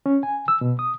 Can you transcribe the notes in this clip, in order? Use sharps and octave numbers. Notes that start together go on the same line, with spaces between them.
C#4
G#5
E6
B2
D#6